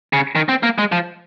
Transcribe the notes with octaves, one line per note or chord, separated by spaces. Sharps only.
C#3
D#3
C4
A#3
G#3
F3